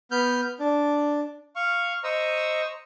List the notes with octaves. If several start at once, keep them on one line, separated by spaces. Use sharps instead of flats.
B3 F6 G6
D4
F5 C#6
C5 D#5 A#5 C#6 E6